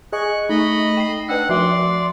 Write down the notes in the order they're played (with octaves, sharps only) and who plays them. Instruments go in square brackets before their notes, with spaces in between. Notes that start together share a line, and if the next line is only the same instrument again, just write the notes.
[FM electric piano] G#4 D#5 G#5 [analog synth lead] C#6 [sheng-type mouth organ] F#6
[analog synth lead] A3 [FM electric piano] D#4 [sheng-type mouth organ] D#5 B5
[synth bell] G5 C7
[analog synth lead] D4 [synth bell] B4 G5 E6 [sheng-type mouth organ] F#5
[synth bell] F3 F#4 E5 [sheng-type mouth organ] D5 [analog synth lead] C6